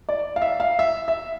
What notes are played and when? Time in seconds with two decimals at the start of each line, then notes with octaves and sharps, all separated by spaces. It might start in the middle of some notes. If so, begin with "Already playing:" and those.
0.09 D5
0.36 F5
0.42 E5
0.60 F5
0.79 E5
1.08 E5